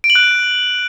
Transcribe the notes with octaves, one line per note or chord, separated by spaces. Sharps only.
D7
F#7
F#6